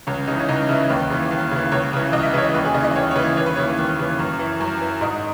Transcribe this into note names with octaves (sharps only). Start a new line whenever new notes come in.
C#2 C#4
C#3 E3 D#4
C#4
C#2 D#4
C#3 E3 E4
D#2 B4
C#3 E3
D#2
C#3 E3
C#2 C#5
C#3 E3
C#2 D#5
E5
C#3 E3 C#5
D#5
D#2 B4
G#4
C#3 E3 D#5
D#5
D#2 C#5
C#5
C#3 E3 B4
D#2 C#5
B4
C#3 E3 C#5
D#2
C#3 E3
F#2
E3
F#2
E3
G#2 D#5